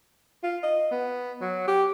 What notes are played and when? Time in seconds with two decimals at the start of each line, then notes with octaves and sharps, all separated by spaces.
0.43 F4
0.63 D#5
0.91 B3
1.41 F#3
1.68 G4